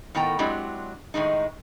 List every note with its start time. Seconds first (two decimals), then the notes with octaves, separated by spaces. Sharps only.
0.15 A2 D#3 B3 A#4 G5 A#5
0.39 F#3 G#3 C4 D4 E4 G4
1.14 A2 D#3 G#3 D#4